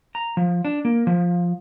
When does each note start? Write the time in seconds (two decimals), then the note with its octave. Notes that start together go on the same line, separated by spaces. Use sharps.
0.15 A#5
0.37 F3
0.65 D4
0.85 A#3
1.07 F3